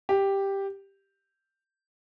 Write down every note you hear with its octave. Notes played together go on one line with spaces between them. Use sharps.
G4